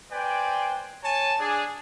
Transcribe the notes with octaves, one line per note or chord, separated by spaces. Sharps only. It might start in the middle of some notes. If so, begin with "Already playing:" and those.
B4 C5 D5 G5 G#5
C#5 G#5 A5
D4 G#4